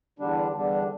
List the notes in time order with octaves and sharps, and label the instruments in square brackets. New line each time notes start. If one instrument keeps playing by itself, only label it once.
[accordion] E2 D3 G3 D4
E2 D3 G3 D4